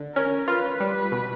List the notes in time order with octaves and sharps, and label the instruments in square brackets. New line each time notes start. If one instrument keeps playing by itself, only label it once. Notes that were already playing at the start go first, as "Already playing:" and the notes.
Already playing: [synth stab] D3
[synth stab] C#4 [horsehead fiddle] A#4
[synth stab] F4 [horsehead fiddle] B4
[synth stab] G3
B2